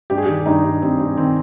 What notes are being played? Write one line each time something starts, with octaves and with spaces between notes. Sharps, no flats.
G2 G4
G#4
D#3 G4
G2 D#4
G2
G2 C4
G2
D#3 C4